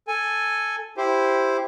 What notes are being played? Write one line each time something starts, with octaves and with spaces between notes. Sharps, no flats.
A4 G#5
E4 G4 C5